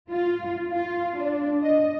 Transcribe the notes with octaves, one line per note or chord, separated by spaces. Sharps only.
F4
F4
D4
D#5